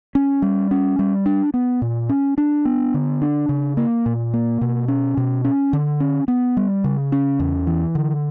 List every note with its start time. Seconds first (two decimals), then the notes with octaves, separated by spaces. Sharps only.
0.15 C#4
0.42 G3
0.71 C#4
0.99 G3
1.26 D4
1.54 B3
1.82 A#2
2.09 C#4
2.38 D4
2.65 B3
2.94 D3
3.22 D4
3.49 C#3
3.77 A#3
4.06 A#2
4.34 A#3
4.61 B2
4.88 C#4
5.17 B2
5.45 C#4
5.73 D3
6.00 C#4
6.28 B3
6.57 G3
6.84 C#3
7.12 C#4
7.39 E2
7.67 E3
7.95 D3